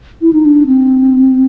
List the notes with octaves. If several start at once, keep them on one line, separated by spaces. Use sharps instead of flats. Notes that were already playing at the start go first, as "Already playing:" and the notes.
E4
D#4
D4
C4